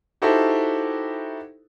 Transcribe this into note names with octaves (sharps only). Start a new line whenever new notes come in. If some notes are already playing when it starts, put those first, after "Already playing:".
D#4 E4 F#4 G4 A4 C5